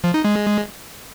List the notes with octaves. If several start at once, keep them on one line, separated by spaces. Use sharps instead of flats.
F3
D#4
G#3